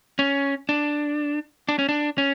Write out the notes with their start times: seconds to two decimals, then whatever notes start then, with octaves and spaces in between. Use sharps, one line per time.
0.19 C#4
0.69 D4
1.69 D4
1.79 C#4
1.89 D4
2.18 C#4